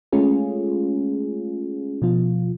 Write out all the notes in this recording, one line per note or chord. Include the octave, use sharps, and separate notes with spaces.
G#3 A3 C#4 F4 G#4
B2 F3 F4